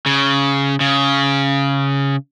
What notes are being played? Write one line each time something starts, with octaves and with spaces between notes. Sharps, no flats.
C#3
C#3